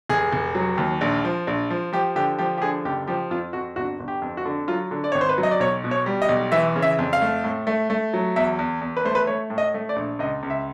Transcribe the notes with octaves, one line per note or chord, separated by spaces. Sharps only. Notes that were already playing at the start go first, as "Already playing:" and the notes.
F1 G#4
F1
F#3
D#2
A#1
F3
A#1
F3
F3 G4
D3 G4
F3 G4
G4
D3 G#4
F#1 G4
F3 G4
F2 F4
F2 F#4
G1 F#4
G1
G4
F2
F#4
D3
F#3 F4
D3
D5
G#1 C#5
C5
B4
F#3
D#5
D5
B1 C#5
B2
C#5
G3
D#5
B1
E3 E5
C#3
E5
F2
F5
A3
A2
A3
A3
F#3
E2 E5
E2
E2
B4
A3 C5
B4
A3 C#5
A2
D#5
A3
D5
A#1
C#2 D#5
C#2
E5